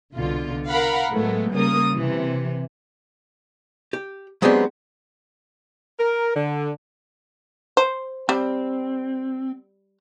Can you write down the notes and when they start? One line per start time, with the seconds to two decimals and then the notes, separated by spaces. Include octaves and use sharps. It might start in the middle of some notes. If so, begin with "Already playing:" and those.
0.14 C2 B2 D3 F4
0.68 A#4 F5 F#5 B5
1.11 A2 F#3 G#3 A3 B3
1.52 C#3 G3 A#3 A#4 D#6
1.93 C3 E3
3.93 G4
4.42 F#3 G#3 B3 C4 D4 G4
5.99 A#4
6.34 D3
7.77 C5
8.29 G3 C4